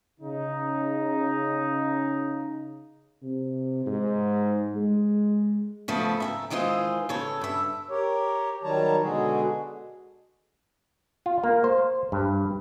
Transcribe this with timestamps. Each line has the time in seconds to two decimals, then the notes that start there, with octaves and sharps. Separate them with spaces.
0.20 C#3 D#4
3.22 C3
3.86 G#2
4.75 G#3
5.88 C#3 F3 A3 B3
6.20 E5 G5 A#5
6.50 D#3 E3 G#3 F4 C5
7.09 C#3 A4 C#5
7.41 G2 E5
7.90 G4 A#4 C#5
8.63 D#3 F#3 G3 C#5 A5 A#5
9.02 B2 D3 G#3 F#4 G#4
11.26 F4
11.44 A#3
11.64 C5
12.12 G2